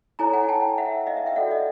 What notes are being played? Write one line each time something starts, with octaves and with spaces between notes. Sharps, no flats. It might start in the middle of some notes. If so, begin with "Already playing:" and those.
E4 A4 C#5 G#5 A#5
F#5 G#5
G5 A5
E5 F#5
D#5 F5
E5 F#5
F5 G5
F#4 A4 D5 E5 F#5
D#5 F5